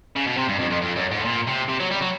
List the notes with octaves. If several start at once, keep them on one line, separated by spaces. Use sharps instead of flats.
C#3
B2
C3
G2
F2
F2
F2
F#2
G#2
A2
A#2
C3
C3
F#3
G3
F#3